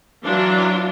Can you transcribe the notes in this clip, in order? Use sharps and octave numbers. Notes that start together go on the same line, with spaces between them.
E3 F#3 D4 F4